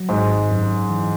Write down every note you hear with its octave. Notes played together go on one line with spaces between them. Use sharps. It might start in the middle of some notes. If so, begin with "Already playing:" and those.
Already playing: F#3
G#1 G#2
F#2
E3